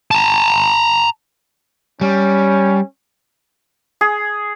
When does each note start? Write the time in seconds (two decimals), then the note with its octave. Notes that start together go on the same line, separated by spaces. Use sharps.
0.11 A5 A#5
2.01 G3 C#4
4.01 G#4